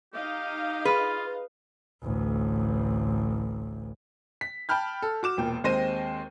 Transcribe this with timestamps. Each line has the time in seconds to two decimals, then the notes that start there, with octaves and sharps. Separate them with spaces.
0.14 D#4 G4 D#5 F5
0.85 F4 G#4 B4 B5
2.03 A1 D2
4.41 B6
4.69 G5 A5 B5 F6 G6
5.02 A4
5.23 F#4 D6 E7
5.37 E1 A#2 G5
5.64 D#2 G#3 C4 C5 A#6 D#7